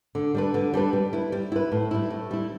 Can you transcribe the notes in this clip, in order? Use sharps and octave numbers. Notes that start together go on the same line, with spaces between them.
D3
G3 D4 B4
D3
G3 D4 B4
G3
E4 B4
G3
E4 B4
A2
G3 E4
A2
G3 E4